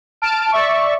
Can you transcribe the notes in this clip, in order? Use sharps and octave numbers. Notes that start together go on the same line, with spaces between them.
A5 F6 D7
D5 E5 C#6